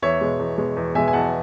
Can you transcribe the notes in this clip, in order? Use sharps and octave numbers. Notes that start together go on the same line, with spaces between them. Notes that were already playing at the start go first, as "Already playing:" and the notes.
E2 C#5 E5
B2 G#3
E2
B2 G#3
E2
B2 G#3 E5 G#5
G#5
E2 F#5 A5